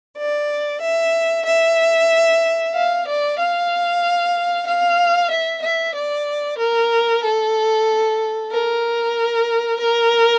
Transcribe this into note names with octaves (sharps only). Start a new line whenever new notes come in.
D5
E5
E5
F5
D5
F5
F5
E5
E5
D5
A#4
A4
A#4
A#4